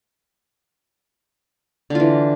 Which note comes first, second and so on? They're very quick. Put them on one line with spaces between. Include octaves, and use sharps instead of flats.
D3 F4 E3